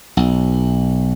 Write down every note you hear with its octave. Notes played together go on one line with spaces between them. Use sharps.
B1